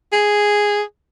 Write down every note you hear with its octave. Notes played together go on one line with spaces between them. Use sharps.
G#4